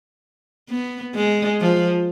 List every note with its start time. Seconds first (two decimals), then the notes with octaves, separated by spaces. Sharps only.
0.69 B3
1.15 G#3
1.60 F3